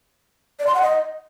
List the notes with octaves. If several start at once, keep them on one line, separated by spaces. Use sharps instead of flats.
D5
C6
F#5
D#5